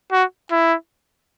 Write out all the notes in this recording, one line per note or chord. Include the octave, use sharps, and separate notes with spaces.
F#4
E4